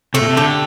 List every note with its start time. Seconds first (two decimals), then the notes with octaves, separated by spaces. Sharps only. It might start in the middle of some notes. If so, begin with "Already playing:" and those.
0.14 C3 A3
0.22 A#2
0.29 C3
0.37 D3 G4